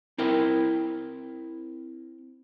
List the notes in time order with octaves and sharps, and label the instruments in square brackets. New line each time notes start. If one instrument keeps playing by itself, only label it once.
[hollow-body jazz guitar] C4 E4 A#4 G5